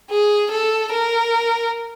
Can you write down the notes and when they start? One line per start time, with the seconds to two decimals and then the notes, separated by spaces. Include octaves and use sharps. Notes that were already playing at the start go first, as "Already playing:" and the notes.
0.10 G#4
0.51 A4
0.93 A#4